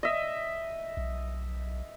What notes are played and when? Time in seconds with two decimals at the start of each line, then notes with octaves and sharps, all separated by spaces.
0.03 D#5 E5
0.97 B1